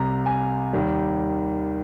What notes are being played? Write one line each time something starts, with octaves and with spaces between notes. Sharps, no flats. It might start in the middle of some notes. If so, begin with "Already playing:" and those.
Already playing: C2 C3 G3 A#5
G#5
D#2 D#3 G3